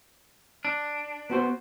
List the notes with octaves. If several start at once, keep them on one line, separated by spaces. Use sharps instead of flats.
D4
B3 F#4 C5